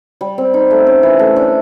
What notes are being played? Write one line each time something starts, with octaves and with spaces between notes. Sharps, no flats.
G3
C4
D#4
A3
C#4
E3
A3
D4